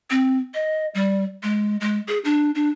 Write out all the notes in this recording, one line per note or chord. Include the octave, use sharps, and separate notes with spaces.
C4
D#5
G3
G#3
G#3
G#4
D4
D4